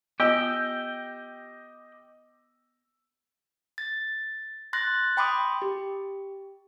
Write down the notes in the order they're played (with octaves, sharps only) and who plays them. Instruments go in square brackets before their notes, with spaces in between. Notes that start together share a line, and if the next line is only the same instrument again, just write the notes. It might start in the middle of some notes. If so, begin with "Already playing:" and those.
[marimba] B3 F4 [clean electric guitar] G4 G5 [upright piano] D#5 E6
[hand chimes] A6
C6 F#6 A6 A#6
G5 B5 C6 D6 D#6
G4